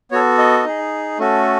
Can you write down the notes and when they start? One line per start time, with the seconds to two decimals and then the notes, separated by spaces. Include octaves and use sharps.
0.11 B3 F#4 A4 C#5
0.38 D#5
0.65 D#4 G#4
1.19 A3 C#4 F#4 A4